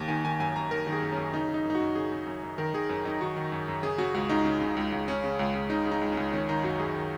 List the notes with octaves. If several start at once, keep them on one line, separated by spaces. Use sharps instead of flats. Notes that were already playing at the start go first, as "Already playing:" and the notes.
Already playing: D#2
D#3 G#5
D#3 G#5
F#2 G#5
F#2 A#5
D#3 A#4
D#3
G#4
F#2
F#2 C#4
C#3 D#4
C#3
D#4
F#2
D#4
F#4
F#2
C#3 G#4
C#3
F#2
F#2
D#3 A#4
D#3 G#4
F#2 A#4
F#2 D#4
D#3 F#4
D#3
F#2
F#2
C#3 G#4
C#3 F#4
C#2 F#4
C#2 D#4
C#3
C#3
C#2
C#2
C#3 C#4
C#3
C#2
C#2
C#3 D#4
C#3
D#4
C#2
C#4
C#2
D#3 C#4
D#3 D#4
F#2 F#4
F#2 G#4
D#3